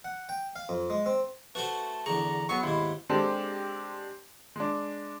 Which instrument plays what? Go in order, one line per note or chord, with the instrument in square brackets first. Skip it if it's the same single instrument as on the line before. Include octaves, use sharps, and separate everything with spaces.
[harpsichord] F#5
G5
F5
F2
G#3
C4
[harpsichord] A3 F#4 C5 [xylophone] B4 [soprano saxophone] A5
[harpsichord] E2 D3 C#6 [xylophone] G#4 [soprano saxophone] A#5
[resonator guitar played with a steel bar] F#3 B3 [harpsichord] G#5 [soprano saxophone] C#6
[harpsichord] D#2 G#2 [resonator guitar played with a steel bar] E4 [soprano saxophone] C6
[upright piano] G#3 C4 D4 G4 A4
G#3 D4